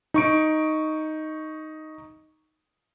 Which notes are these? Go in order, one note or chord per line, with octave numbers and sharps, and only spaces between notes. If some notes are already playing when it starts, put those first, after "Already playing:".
D#4 C#6 D7